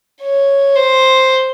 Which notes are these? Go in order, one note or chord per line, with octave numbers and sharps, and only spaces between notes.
C#5
C5